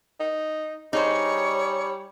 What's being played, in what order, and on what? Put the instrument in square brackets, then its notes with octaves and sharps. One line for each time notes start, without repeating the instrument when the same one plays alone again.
[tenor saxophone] D#4
[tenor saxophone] G3 [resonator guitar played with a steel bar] D#4 G#4 C5 [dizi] C#5